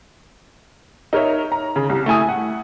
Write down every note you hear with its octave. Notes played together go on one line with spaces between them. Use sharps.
D#4 A#4 C#5 E5
A#5
C#3
C2
A3 E4 G#5 D#6
F#5